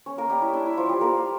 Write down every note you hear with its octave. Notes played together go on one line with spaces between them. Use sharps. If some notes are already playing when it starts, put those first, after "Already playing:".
C#4 C#5
A#3 A#4
G3 G4
E4
D4
E4
F3 F4
G3 G4
A#3 A#4